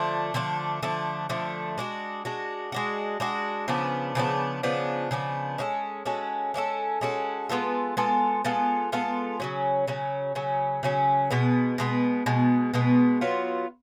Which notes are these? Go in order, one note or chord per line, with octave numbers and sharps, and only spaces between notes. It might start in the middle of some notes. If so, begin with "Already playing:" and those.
Already playing: D3 F3 A3 D4
D3 F3 A3 D4
D3 F3 A3 D4
D3 F3 A3 D4
G#3 D4 F#4
G#3 D4 F#4
G#3 D4 F#4
G#3 D4 F#4
C#3 F3 B3 D4
C#3 F3 B3 D4
C#3 F3 B3 D4
C#3 F3 B3 D4
G#3 C#4 F#4 A4
G#3 C#4 F#4 A4
G#3 C#4 F#4 A4
G#3 C#4 F#4 A4
G#3 B3 F4 A4
G#3 B3 F4 A4
G#3 B3 F4 A4
G#3 B3 F4 A4
C#3 F#3 C#4
C#3 F#3 C#4
C#3 F#3 C#4
C#3 F#3 C#4
B2 G#3 B3
B2 G#3 B3
B2 G#3 B3
B2 G#3 B3
F#3 B3 F4